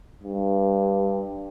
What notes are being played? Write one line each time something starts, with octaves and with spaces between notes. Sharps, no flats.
G2